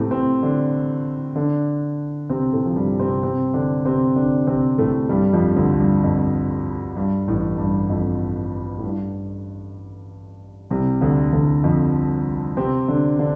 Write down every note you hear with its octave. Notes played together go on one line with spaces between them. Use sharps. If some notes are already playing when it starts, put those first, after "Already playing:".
Already playing: A2 C3 A3 C4
C3 C4
D3 D4
D3 D4
C3 C4
A2 A3
F3
G2 G3
C3 C4
C3 C4
D3 D4
C3 C4
D3 D4
C3 C4
A2 A3
G2 G3
F2 F3
D2 D3
G2
F2
G2
A1 A2
G2
F2
A2
G2
C2 C3
D2 D3
D2 D3
F2 F3
C3 C4
D3 D4
D3 D4